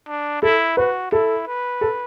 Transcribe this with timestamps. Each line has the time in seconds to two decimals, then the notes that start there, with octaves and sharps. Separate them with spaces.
0.08 D4
0.42 E4 A4
0.77 F#4 B4
1.12 E4 A4
1.47 B4
1.81 A4